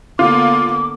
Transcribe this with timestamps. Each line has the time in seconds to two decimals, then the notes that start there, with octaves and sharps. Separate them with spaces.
0.19 D3 A#3 B3 F4 D6